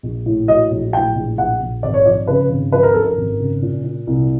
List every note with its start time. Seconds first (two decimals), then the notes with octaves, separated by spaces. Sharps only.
0.03 A#1
0.26 A2
0.48 F#3 D#5
0.71 A#1
0.93 A2 G5
1.15 A#1
1.38 A#1 F#5
1.61 A#1
1.83 G#1 D5
1.94 C#5
2.06 F3 D5
2.27 C#3 B4
2.50 G#1
2.72 F3 B4
2.83 A#4
2.94 F#2 A4
3.04 A#4
3.17 G#1
3.40 C#3
3.62 A#2
3.84 A#2
4.07 C2